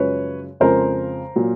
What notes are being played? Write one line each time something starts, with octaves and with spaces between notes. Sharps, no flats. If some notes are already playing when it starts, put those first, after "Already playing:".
Already playing: F#2 C#3 F3 G#3 B4 C#5
F2 C#3 F3 G#3 A#4 C5
A#2 F#3